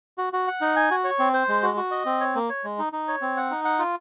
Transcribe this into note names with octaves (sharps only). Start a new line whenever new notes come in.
F#4
F#4
F#5
D#4
G#5
F#4
C#5
C4
C5
G#3
F#4
F#4
D#5
C4
C#5
A#3
C#5
G#3
D#4
D#4
C#5
C4
F#5
D#4
F#5
F4